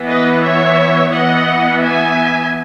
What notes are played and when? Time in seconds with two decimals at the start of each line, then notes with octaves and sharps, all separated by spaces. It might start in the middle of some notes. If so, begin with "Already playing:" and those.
Already playing: E3 B3
0.08 B4 D#5
0.43 C#5 E5
1.13 E3 B3 D#5 F#5
1.82 E5 G#5